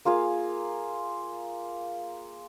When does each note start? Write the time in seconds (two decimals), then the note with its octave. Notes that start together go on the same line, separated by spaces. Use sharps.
0.05 A#3 F4 G#4 F5